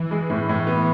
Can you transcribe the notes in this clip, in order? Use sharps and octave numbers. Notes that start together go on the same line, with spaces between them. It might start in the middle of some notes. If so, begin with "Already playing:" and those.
Already playing: E3
G#3
A2
A2
B3